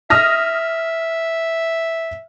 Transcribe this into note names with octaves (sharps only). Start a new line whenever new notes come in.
E5 D#6 F6 A#6